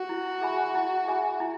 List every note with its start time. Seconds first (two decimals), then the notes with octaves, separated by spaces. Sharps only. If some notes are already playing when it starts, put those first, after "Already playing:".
Already playing: F#4
0.09 E4
0.42 G#4 E5 G#5 B5
0.75 E4
1.08 G#4 E5 G#5 B5
1.40 E4